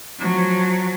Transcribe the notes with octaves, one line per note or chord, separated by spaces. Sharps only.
F3 F#3